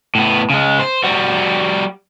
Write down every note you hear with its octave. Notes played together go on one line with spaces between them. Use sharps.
A2 B3
C#3 G#3
C5
G3 F#4